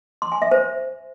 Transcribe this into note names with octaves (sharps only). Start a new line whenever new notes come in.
C6
G#5
E5
C5